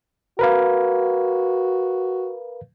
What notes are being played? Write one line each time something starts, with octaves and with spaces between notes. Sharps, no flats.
F#4 A#4 B4 F5